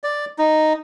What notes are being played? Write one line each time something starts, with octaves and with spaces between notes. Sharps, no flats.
D5
D#4